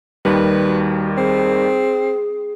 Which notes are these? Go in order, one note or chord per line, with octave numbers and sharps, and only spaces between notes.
D#2 D#3 G3 B4
F#4
C4 G#4